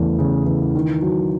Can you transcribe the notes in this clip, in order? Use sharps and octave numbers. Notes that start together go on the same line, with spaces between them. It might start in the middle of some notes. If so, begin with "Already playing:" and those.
Already playing: E2 C#3 E3 A3
C#3
E3
D#3
F#3